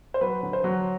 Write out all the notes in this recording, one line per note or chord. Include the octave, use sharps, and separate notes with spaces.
C5
F#3 B4
D3
C5
F#3